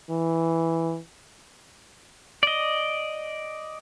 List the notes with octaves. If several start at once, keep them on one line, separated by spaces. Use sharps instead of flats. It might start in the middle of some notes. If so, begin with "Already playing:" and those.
E3
D5 D#5